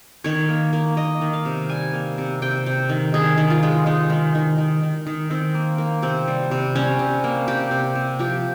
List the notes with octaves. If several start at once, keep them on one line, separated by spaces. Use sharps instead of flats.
D#3 C#5
A#3
A#3
A#3 D#5
D#3
F5
C3
G3 G#5
A#3
C3
C3 G5
C3
D#3
D#3 G#4
D#3
F4
G#3
G#3 D#4
D#3
D#3
D#3
D#3
D#3
D#3 C4
A#3
A#3
C3 C4
G3
C3
G3 C#4
C3
A#3
C3 G4
C3
C3
F3 G4